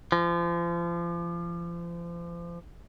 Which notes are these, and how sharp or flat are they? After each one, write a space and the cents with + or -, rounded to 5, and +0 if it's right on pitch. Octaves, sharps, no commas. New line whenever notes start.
F3 -35